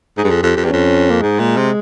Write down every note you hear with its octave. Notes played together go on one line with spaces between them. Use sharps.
G#2 G#4
G2
F2
F2 G4
F2
E2
F2 C#4
A#3
G#2 G#3
A#2
C3